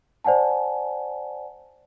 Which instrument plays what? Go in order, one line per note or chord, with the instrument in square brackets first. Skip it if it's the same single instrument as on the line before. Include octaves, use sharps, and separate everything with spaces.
[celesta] C5 D5 F#5 G#5 A5